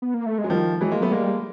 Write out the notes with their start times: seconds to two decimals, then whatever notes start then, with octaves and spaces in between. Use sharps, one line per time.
0.02 B3
0.14 A#3
0.26 A3
0.38 G#3
0.44 F#3
0.49 D#3 F3 G3
0.81 E3 F#3 G#3
0.91 G#3 A#3
1.01 F#3 A3 B3
1.12 G3 G#3 A#3